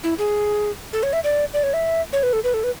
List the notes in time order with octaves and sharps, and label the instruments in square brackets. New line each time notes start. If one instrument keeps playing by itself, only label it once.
[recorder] E4
G#4
A4
C#5
E5
D5
D5
C#5
E5
C#5
B4
A4
B4
A4
B4